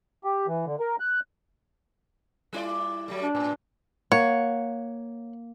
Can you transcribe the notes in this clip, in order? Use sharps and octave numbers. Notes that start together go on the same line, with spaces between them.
G4
E3
D3
A#4
F#6
G3 E4 D5
F#3 G3 A3
D4
A2
A#3 C#5 F#5